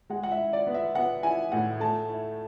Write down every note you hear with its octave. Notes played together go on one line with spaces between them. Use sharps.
G#3 F#5
F#5
E5
E4
D5
B3
E5
B3 F#5
E4 G#5
A2 F#5
A3 A5
E4